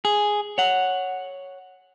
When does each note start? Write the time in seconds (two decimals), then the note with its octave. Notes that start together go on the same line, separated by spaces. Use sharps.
0.05 G#4
0.58 C#5 F#5